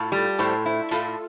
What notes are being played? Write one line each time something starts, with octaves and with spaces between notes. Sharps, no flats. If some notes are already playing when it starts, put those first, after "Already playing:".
Already playing: A2 F4 A4
G3
A2 A4 C5
E4
A2 F4 A4